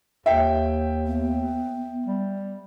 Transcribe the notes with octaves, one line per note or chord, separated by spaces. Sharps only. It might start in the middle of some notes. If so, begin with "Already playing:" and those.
D#2 E5 G5
B3
G3